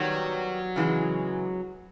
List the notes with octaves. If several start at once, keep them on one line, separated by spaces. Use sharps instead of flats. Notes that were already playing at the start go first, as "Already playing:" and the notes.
Already playing: D#3 F#3 G3 B3
C#3 E3 G#3